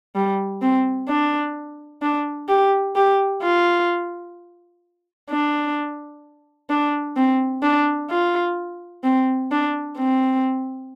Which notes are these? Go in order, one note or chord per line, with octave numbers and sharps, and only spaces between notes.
G3
C4
D4
D4
G4
G4
F4
D4
D4
C4
D4
F4
C4
D4
C4